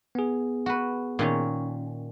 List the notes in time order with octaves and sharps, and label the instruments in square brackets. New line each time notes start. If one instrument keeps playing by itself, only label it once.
[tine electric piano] B3 G#4
[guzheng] F#4 B4
A#2 D#3 C#4